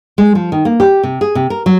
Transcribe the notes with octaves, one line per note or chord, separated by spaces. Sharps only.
G#3
F3
D#3
A#3
G4
C3
G#4
C3
A#4
F#3